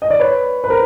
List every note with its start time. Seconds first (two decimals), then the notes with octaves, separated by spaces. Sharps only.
0.02 D#5
0.10 D5
0.20 B4 C#5
0.64 B4
0.69 A#4 C5